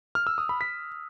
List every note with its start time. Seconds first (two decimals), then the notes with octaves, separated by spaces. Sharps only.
0.15 F6
0.27 E6
0.38 D#6
0.49 B5
0.61 B6